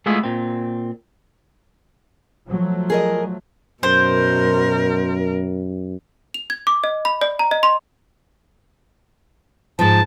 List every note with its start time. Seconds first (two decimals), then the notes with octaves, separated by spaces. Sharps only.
0.06 G#3 A3 B3 E4 F4 G#4
0.24 A#2 C4
2.48 F3 F#3 A3
2.90 G#4 A#4 D#5
3.83 F#2 B2 A#4 C5
6.34 F7
6.50 G#6
6.67 D6
6.84 D#5
7.05 B5
7.21 D5
7.39 A#5
7.51 D#5
7.63 C6
9.79 G#2 F3 A5